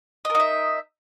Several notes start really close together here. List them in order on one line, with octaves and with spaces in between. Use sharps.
D#5 A#4 D#4 E5